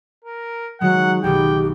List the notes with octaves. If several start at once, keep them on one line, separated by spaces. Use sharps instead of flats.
A#4
D#3 F#3 G#3 F#5
B1 B2 D#3 G4 G5